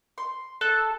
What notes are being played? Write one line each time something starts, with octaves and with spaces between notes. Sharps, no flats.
C6
A4 F#6